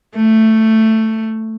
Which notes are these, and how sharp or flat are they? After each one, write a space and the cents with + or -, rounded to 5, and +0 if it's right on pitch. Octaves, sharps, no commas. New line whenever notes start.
A3 +5